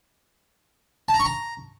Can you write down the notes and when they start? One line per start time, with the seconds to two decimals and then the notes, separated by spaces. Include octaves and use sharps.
1.09 A5
1.14 A#5
1.20 C#6
1.25 A#5